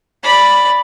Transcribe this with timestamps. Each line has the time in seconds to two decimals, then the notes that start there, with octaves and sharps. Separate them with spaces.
0.24 D5 B5